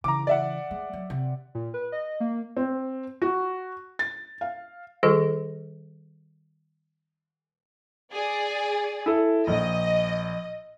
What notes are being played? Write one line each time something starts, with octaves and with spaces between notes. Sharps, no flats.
C#3 E3 A#5 D6
D5 E5 F#5
G#3
F#3
C3
A#2
B4
D#5
A#3
C4
F#4
A6
F5
D#3 G3 F4 G#4 A4
G#4 D5
E4 A4
A#1 D#5